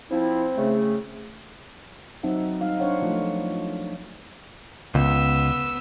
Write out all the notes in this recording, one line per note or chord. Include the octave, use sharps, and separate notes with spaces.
F3 C4 E4
C#3 A3
F#3 C4 D#4 E5 F#5
G3 D#4 F5
A#3 D4 C5 C#5 F5 F#5
F3 A3
C#2 B3 E6